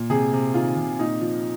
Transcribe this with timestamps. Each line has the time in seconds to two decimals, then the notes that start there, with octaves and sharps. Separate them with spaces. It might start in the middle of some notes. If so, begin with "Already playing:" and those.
Already playing: A#2
0.10 C3 G#4
0.33 C3
0.54 D#3 F4
0.76 C3
0.99 A#2 D#4
1.21 F3